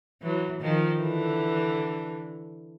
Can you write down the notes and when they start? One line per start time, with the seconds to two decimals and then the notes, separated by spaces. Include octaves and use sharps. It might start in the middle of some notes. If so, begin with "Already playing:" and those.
0.22 E3 F#3
0.61 D#3 F3
1.00 D3 E3